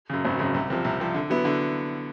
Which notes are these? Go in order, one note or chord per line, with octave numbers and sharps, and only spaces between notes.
F#2 C#3
G#1
F#2 C#3
C2
C3 F3
C2
C3 F3
D3
F#3 B3 E4
D3